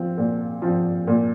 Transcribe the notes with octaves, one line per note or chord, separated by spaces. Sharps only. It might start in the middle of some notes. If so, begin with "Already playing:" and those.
Already playing: F3 C4
A#2
F3 C4
A#2